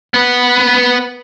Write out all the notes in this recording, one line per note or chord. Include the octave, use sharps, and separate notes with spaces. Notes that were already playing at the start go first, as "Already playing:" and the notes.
B3 B4